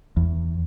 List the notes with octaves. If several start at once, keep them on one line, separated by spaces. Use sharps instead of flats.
E2